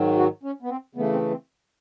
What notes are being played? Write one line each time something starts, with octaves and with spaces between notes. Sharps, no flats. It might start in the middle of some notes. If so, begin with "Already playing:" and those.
Already playing: G#2 D#3 F#3
F#4
C#4
B3
C4
C#3 E3 A3 B3
C4
C4